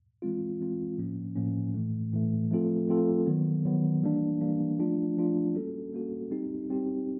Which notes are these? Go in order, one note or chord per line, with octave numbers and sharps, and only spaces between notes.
E3 G#3 C4 F4
E3 G#3 C4 F4
A2 F3 A#3 C#4
A2 F3 A#3 C#4
A2 E3 A3
A2 E3 A3
F3 A3 C4 F4 A4
F3 A3 C4 F4 A4
D#3 F#3 B3
D#3 F#3 B3
E3 G3 A#3 D4
E3 G3 A#3 D4
F3 A3 D4 F4
F3 A3 D4 F4
G3 A#3 C#4 F#4 A4
G3 A#3 C#4 F#4 A4
G3 C4 D#4 G4
G3 C4 D#4 G4